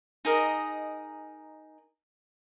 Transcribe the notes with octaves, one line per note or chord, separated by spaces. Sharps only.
D#4 G#4 A#4 D#5